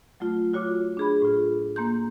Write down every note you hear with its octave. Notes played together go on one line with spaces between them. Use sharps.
F#3 A3 F4
F4 F#4 C#5 D6
D4 G#4 B5
A2 F4
A#3 A#5 C6 G6